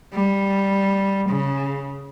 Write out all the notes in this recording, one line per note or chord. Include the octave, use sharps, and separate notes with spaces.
G3
C#3